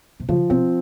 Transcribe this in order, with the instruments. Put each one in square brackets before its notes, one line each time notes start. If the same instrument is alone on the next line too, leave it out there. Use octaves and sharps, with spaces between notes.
[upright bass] C3
[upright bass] C#3 [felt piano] F3
[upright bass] C3 [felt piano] C4